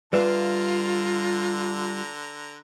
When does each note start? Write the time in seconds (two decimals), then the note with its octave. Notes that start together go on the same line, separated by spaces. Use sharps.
0.13 D3 G3 F4 B4 D5 E5 F5 A#5